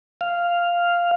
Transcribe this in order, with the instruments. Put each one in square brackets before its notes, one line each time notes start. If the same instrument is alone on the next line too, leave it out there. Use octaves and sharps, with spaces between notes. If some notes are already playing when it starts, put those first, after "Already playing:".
[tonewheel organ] F5